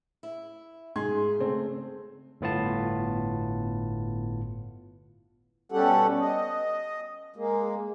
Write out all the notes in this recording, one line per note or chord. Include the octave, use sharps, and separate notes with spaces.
E4
G#2 G#4 C6 G#6
C#3 A3 C4
G1 A2 B3 F4 A5
B2 G3 C#4 G4 A4 F#5
D#5
G#3 A#3